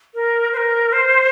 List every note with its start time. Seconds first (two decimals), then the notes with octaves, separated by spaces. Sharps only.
0.14 A#4
0.53 C5
0.57 A#4
0.92 C5